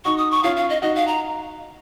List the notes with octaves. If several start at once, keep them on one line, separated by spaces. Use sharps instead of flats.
D#4 F#4 C#6
D#6
C#6
C#4 F4 F5
F5
D#5
D#4 F#4 D#5
F5
A#5